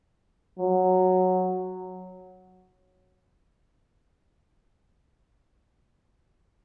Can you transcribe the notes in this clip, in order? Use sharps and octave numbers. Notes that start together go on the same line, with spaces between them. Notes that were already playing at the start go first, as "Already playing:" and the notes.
F#3